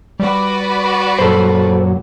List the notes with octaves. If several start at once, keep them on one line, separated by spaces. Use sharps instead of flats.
G3 F#4 B4 D5
F#2 A#2 F#3 A4 C5